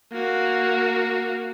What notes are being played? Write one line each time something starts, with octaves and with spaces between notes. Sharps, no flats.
A#3 F#4